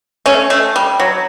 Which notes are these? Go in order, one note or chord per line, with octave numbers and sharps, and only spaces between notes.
A3 C#4
A3
G3
F#3